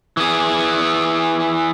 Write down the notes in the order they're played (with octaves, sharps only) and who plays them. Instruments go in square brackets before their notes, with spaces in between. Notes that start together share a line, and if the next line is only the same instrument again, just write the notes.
[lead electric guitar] E3 G#4